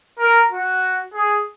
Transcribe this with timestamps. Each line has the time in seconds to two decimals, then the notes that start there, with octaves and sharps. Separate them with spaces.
0.19 A#4
0.51 F#4
1.14 G#4